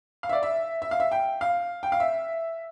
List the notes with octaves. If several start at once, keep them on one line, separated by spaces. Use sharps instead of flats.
F5
E5
D5
E5
E5
F5
E5
G5
F5
G5
F5
E5